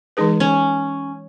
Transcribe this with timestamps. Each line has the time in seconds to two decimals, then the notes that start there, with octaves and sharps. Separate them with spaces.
0.17 E3 G#3 D#4 G#4 B4
0.40 C#4